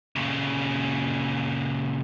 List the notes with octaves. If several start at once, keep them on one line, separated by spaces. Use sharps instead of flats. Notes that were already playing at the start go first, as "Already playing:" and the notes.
A#2 C#3